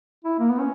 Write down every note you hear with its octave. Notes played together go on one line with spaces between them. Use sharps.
E4
A#3
B3
C#4